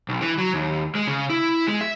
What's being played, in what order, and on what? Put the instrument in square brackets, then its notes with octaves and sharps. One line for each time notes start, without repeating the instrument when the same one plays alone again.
[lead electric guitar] B1
E3
F#3
D#2
G#3
C#3
E4
G#3
E5